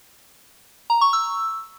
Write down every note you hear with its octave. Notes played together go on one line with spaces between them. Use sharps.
A#5
C#6
E6